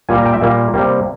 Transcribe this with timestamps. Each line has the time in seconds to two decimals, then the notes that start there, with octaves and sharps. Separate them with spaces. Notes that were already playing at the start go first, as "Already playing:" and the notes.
0.09 A#2 G3 A#3 G#5
0.18 A#5
0.25 G5
0.34 E5
0.42 A#2 G3 A#3
0.74 C3 G3 A#3